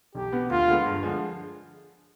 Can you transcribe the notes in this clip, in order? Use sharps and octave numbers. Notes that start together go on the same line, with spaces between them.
B1 G4
B2 B3
D2 F4
D3 G#3 B3
G2
D3 F3 G#3